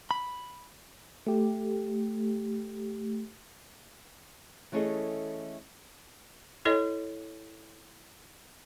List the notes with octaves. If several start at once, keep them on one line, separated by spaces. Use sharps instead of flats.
B5
A3 G4
E3 A3 C#4 G#4 A4 D#5
E4 A4 C#5 D#5